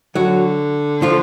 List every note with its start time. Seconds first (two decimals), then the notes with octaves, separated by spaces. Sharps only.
0.15 D3 F#3 F#4
1.02 F3 F4